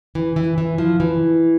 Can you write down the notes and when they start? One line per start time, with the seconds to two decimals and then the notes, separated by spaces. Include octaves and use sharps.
0.15 E3
0.36 E3
0.58 E3
0.78 F3
1.00 E3